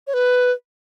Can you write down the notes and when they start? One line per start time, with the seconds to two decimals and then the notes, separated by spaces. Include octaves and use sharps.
0.07 C#5
0.14 B4